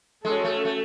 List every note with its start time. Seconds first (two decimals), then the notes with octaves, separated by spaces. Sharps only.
0.24 G#3 C#4 F#4 A4
0.44 A3
0.65 A3